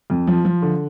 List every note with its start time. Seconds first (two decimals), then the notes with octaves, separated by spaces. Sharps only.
0.10 F2
0.27 F3
0.45 F3
0.62 D3